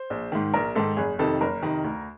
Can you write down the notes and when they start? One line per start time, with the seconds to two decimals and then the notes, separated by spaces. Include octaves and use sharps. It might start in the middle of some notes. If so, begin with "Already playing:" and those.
Already playing: C5
0.10 A#1
0.32 G#2 D#3
0.54 A#1 A#4
0.75 G#2 D#3 A4
0.97 F#1 G#4
1.19 F2 C3 D#3 A4
1.41 F#1 A#4
1.62 F2 C3 D#3
1.84 D2